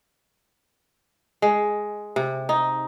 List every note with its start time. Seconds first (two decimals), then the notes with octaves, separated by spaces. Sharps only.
1.42 G#3
2.16 C3
2.49 D#4